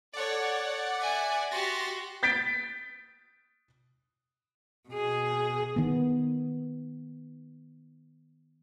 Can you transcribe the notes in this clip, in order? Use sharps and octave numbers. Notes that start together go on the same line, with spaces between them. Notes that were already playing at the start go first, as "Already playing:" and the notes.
A4 C#5 D5 F#5
E5 G#5
F#4 G4 C6 A6 A#6
G6 A6 B6 D7
B2 G#4
D#3 B3